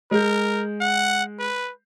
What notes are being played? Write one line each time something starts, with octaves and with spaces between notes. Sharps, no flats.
G#3 A#4 G6
F#5
B4